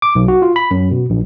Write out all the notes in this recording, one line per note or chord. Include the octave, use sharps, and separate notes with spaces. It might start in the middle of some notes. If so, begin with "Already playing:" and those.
D6
B1
F#4
F4
B5
F#2
B2
A#1